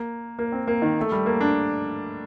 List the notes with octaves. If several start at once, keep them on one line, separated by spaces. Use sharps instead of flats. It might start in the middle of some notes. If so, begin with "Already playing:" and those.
Already playing: A#3
A#3
C4
A#3
D#3
A3
G3
A#3
D4